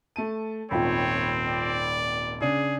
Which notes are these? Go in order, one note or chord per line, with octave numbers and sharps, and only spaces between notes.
A3 A5 D#7
D#1 G#1 C4 F4 C#5 G5 B5
D5
C#3 D4 G#4